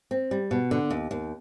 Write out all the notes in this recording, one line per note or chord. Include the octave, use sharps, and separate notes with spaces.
C4
G3
B2
D3
D#2
D#2